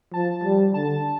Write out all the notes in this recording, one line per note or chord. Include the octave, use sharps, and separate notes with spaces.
F3 A5
G3
D3 A5